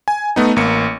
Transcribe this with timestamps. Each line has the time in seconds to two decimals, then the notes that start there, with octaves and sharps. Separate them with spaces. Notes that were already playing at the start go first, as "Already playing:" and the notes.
0.08 G#5
0.36 A3 B3 D#4
0.56 A1 A#3 C#7